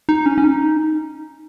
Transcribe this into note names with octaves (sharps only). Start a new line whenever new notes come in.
D#4
C#4
C#4
D#4